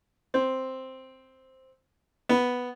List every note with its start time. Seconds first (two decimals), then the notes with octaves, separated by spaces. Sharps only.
0.34 C4
2.29 B3